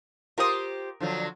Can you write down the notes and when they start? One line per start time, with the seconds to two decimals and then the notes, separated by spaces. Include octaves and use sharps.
0.38 F4 G4 A#4 C5 D#6
1.00 D3 F3 F#3